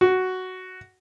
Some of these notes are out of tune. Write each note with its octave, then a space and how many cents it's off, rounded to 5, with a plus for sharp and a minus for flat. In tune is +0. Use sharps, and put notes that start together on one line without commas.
F#4 +5